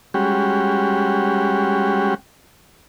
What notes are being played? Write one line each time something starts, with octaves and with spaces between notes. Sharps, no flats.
G3 G#3 C#4 F#4 G4